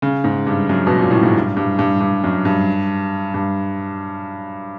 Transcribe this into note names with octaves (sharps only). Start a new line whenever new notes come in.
C#3
G#2
G2
F#2
B2
A#2
A2
G#2
G2
G2
G2
G2
F#2
G2
G2